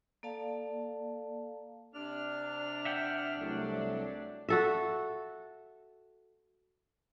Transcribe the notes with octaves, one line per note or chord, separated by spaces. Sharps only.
A#3 A4 D5 F5 A5
C3 D4 F6
E5 F#5 G5
C2 F#3 A3
F#4 A4 E5